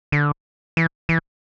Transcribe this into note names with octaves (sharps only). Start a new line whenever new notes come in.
D3
E3
E3